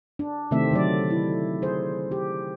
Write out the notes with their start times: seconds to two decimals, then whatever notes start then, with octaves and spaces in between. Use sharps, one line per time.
0.19 D4
0.51 C3 D#3 A3 C4 E5
0.71 D3 F#3 D5
1.10 E4
1.62 G#4 C5
2.11 G4